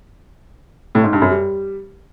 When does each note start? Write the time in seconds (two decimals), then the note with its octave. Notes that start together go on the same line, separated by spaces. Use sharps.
0.95 A2
1.04 G#2
1.13 G2
1.22 F#2
1.31 G3